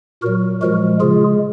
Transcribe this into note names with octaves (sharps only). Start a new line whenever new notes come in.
A#2 F#3 F#4 A#4
A#2 F3 G#3 F#4 A#4
C#3 G#3 F4 G#4